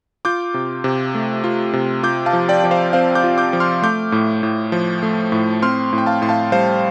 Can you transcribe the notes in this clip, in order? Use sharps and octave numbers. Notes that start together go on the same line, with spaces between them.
F4 D6 G6
C3
C3
A3
F4
C3
F4 D6 G6
F5 A5
F3
D5 G5
F3 D5
C5 F5
C4 C5 F5
D6 G6
F4
D6 G6
F3
C6 F6
A3 D6 G6
A2
A2
F3
A3
A2
C4 C6 F6
A2
G5
F5 A5
A2 C6
F5 A5
G3 C5 F5